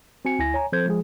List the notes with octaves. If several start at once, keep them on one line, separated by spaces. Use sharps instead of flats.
C4 F#4 G#5 C#7
D2 E4 G#5 A#6
C#5 G#5 A#5
F3 C4 A4 C5 G6 G#6
F3 G#3 G#4